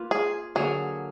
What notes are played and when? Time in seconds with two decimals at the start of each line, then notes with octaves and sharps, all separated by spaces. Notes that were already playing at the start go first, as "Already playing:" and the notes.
Already playing: A#3 F4 B4
0.11 G#4
0.55 D3 F#3 A#3 G#4